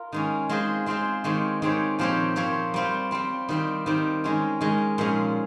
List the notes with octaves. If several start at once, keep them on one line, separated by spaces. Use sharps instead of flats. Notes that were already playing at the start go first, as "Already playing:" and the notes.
Already playing: F4 A#4
D#3 G#3 C#4
G#3 C4 F4 G#4 C5
G#3 C4 F4 G#4 C5
D#3 G#3 C4 G4 C#5
D#3 G#3 C4 G4 C#5
A#2 F3 C4 G4 C#5
A#2 F3 C4 G4 C#5
G3 C4 F4
G3 C4 F4
D#3 G3 C4 G4
D#3 G3 C4 G4
D#3 G#3 C#4
D#3 G#3 C#4
A#2 F3 G#3 C#4